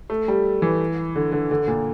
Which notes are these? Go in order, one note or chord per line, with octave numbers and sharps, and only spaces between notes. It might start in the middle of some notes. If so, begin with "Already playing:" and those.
A3
G3
E3
D3
D3
D3
A#2